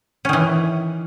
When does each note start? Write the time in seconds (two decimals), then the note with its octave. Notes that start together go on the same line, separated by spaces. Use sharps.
0.25 C#4
0.29 D#3
0.33 E3